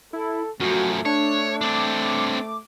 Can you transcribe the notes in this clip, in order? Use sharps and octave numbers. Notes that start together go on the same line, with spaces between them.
E4 A4
F#2 F3 A3 F#4
D4 C#5
C4 D4 D6